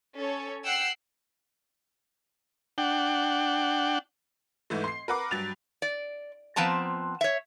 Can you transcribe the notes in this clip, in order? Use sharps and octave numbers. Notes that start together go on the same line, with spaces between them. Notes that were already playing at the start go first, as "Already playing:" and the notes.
C#4 A4 C#5
F#5 G5 E6 F#6 C7
D4 F#5 G5
G#2 E3 A3
C6 C7
A#4 B4 F#5 D6
G2 F#3 A6 F7
D5
F3 B3 C4 A5 A#5
C#5 E5